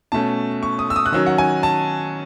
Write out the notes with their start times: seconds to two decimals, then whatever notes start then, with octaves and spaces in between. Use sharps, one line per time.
0.12 B2 A3 C#4 A5
0.63 C#6
0.79 D#6
0.90 E6
0.96 D#6
1.06 F#6
1.12 D#3 F#3 C#4 E6
1.26 F#5
1.38 G#5
1.63 A5